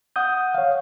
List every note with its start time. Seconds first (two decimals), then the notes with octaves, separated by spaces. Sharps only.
0.16 F#5 D#6 G6
0.55 C#5 F5